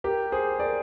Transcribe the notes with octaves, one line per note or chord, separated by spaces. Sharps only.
G4 A#4
G#4 C5
A#4 D5